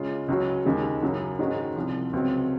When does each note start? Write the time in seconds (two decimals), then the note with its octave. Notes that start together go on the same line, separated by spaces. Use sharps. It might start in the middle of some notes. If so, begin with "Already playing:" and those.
Already playing: C#3 G#3 C#4 F4
0.28 C#2 C#3 F#3 C#4 F#4
0.65 D#2 C#3 G#3
1.02 F#2 C#3 F#3
1.39 G#2 D#3 G#3 C#4 F#4
1.76 C2 C3 F3
2.13 C#2 C3 F#3 C4